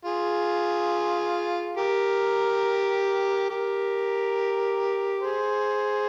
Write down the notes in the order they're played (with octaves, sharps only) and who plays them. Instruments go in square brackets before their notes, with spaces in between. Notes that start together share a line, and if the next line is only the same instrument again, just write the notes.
[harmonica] F4 G#4
G4 A#4
G4 A#4
G#4 C5